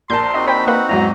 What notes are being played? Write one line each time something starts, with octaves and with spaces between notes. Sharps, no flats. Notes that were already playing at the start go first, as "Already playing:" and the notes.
A#1 A#4 A5 C6 G6
C5 A#5
C4 D#4 F#4 D#5
C5 G5 B5
A#3 B4 F#5 B5
E2 G#2 F#3 E4 A#5